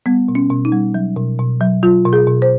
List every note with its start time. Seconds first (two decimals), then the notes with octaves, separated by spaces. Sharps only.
0.06 G3 B3
0.28 B2
0.35 C#4
0.50 B2
0.65 D#4
0.72 G3
0.94 F#3
1.17 B2
1.39 B2
1.61 F#3
1.83 F#3 F4
2.05 B2
2.13 G#4
2.27 B2
2.42 C5